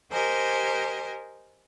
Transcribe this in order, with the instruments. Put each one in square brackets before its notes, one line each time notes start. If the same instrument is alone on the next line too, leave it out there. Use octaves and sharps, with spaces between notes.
[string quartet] G4 A#4 C5 D#5 G#5